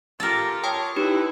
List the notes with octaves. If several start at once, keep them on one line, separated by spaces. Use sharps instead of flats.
F4 G4 A4 A#4
C#5 G5 A5 D#6
D#4 E4 G4 B4